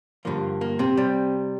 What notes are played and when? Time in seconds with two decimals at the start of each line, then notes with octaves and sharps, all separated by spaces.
0.25 G2 D3 F3 A#3
0.61 A#3
0.79 C3 C4
0.97 C3 G3